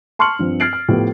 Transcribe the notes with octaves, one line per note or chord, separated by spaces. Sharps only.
A5 C6 C#6 F6 C#7 F#7
G2 F3 C4
F6 G#6 A6 C7 D7 F#7
F6
A2 F3 B3 G4